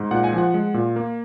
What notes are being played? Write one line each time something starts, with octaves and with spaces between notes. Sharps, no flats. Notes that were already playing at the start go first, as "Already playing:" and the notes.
Already playing: G#2
A#2 F#5
G#5
F3 F#5
G#3
A#2
A#3